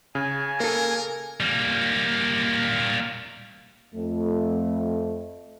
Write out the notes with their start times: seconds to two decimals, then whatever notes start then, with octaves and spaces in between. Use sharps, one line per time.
0.15 C#3 G#5
0.60 A#3 A4 A#4
1.40 G3 A#3
3.94 F2 A3